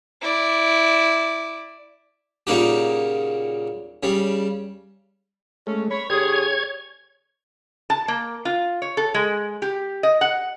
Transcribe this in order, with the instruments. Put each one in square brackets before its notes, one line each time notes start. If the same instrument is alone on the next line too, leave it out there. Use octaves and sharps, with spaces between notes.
[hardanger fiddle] E4 D5
[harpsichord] A#2 C#3 A#3 D#4 F#4 G4
C#3 G3
[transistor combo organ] G#3 A3 [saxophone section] C#4
[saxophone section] C#5 [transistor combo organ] B5
[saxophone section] D3 G#4 [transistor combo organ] G4 [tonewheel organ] C#5 G#6
[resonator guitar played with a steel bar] A5
A#3
F4
C#5
A4
G#3
G4
D#5
F#5